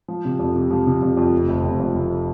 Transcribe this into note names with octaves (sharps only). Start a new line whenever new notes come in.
F3
C3
F2
C3
F3
C3
F2
F2
F1
F1
F1
F2
F1